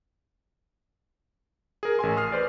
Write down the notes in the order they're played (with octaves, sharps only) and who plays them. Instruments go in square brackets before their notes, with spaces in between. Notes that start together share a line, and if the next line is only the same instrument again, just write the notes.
[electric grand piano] G#4 A#4
A1 A#4 G#5 C6
C6 D#6 F6 C7
B4 C5 D5